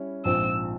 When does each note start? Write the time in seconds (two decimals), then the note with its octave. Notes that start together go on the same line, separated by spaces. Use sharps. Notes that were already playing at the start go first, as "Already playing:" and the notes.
Already playing: G3 C#4 E4
0.25 A#1 G#2 F3 C4 E6